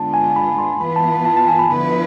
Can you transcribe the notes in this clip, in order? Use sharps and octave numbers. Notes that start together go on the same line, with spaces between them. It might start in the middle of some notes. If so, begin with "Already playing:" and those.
Already playing: D3 G#3 B3 D4 F4 A5
G#5
B5
C6
E3 B3 F4 B4 B5
A5
A5
A5
G#5
B5
D3 F3 B3 E4 B4 B5